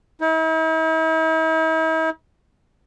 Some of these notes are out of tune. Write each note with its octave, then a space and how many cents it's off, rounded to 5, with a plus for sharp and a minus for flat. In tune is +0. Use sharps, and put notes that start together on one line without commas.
E4 -45